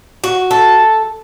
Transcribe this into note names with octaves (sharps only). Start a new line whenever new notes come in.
F#4
A4